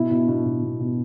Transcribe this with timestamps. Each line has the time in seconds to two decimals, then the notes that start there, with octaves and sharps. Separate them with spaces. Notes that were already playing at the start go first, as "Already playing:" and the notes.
Already playing: B2 E4
0.11 B2
0.28 B2
0.45 B2
0.63 B2
0.80 B2